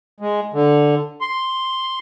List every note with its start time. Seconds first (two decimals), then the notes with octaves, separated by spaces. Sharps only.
0.20 G#3
0.54 D3
1.21 C6